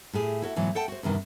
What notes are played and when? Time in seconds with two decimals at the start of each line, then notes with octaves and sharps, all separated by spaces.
0.13 A2 G4 G#4
0.42 E4 F#4 A4
0.56 G#2 B2 E3 F#3
0.75 A4 F#5 G5 A5
0.88 F#4 C5
1.03 E2 G2 C3 D#3